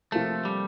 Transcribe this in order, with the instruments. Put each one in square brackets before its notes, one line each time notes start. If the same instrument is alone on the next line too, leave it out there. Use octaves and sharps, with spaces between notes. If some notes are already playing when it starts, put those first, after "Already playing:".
[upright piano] C3 F3 A#3 F4 A4 [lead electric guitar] A3
[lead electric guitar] G3